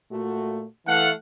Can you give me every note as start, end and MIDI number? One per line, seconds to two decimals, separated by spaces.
0.11 0.64 46
0.11 0.64 57
0.11 0.64 66
0.86 1.12 52
0.86 1.12 57
0.86 1.09 77
0.86 1.09 78